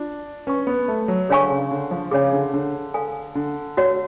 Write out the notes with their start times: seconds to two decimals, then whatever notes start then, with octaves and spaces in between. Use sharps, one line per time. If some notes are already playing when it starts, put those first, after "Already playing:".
Already playing: D4 F4
0.47 C#4 B4 F#5 C#6
0.67 B3
0.88 A3
1.08 F#3
1.29 D3 G#4 C#5 F5 G#5 C#6
1.50 C#3
1.71 D3
1.91 F3
2.11 C#3 G#4 C#5 G#5
2.33 D3
2.54 D3
2.94 A4 F5 G#5
3.35 D3
3.77 F#4 C#5 F#5